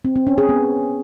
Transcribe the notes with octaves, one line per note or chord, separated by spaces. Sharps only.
C4
C4
C#4
G#4
B3